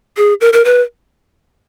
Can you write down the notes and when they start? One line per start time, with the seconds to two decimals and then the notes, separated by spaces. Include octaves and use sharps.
0.17 G#4
0.41 A#4
0.53 A#4
0.65 B4